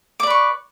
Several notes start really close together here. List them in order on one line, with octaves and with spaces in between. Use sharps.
D6 D5 B4 C#6